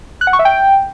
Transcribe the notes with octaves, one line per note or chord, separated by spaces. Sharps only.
F#6
F#5
C#6
E5
G5